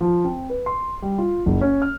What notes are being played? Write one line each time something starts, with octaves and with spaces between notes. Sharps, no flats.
F3
C4
B4
C6
G3
F4
F#1
C#4
F6